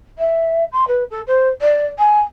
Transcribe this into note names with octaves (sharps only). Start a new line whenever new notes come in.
E5
C6
B4
A4
C5
D5
G#5